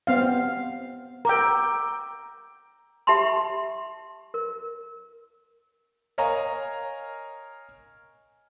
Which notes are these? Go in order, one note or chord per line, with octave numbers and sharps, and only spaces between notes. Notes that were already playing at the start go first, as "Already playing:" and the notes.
B3 C4 F5
A#4 G5 A#5 D6 E6
G4 E5 A5 B5 C6
A#4
A#4 C#5 D#5 F5 G#5 A#5